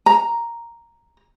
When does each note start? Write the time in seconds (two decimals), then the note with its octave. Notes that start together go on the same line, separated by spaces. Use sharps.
0.06 A#5